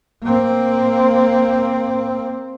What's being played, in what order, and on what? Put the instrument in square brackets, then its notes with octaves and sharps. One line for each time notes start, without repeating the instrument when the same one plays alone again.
[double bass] A#3 C4